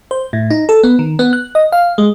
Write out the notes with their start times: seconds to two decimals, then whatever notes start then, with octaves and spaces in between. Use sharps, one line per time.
0.11 C5
0.33 A2
0.50 D#4
0.69 A4
0.83 B3
0.99 D#3
1.19 B3
1.33 F#6
1.55 D#5
1.72 F5
1.98 G#3